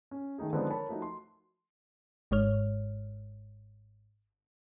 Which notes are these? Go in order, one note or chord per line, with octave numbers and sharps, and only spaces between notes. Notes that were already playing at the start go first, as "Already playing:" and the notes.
C#4
D#3 A3 D#4 G#4
D3 F3 G#3 B3 C4 D#4
A#4 C#5 A5 B5
F3 A3 D#4 F#4
C6
G#1 G#2 G#3 C#5 F6